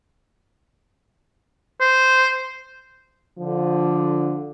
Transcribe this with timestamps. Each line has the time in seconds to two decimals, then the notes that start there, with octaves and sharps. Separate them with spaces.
1.81 C5
3.38 D3 F3